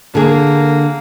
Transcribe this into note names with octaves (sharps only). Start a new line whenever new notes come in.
D3 A#3 G#4